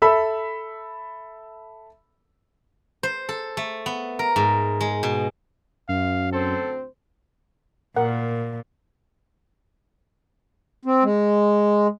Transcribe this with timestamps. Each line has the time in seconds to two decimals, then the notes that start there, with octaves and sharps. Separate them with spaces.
0.02 A4 E5 B5 E6
3.03 C5
3.29 A4
3.57 A3
3.86 B3
4.19 A#4
4.36 G#2
4.81 G#3
5.03 B2
5.89 F#2 F5
6.33 D2 C4 A4 C5
7.96 A#2 A#4 F#5
10.85 C4
11.04 G#3